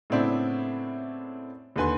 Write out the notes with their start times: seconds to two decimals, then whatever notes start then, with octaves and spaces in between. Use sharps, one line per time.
0.10 A2 C#3 B3 C4 D4 E4
1.76 D#2 D3 B4 G#5 C6